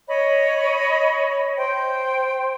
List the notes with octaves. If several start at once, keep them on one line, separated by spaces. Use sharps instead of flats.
C#5 D#5 B5
C5 G5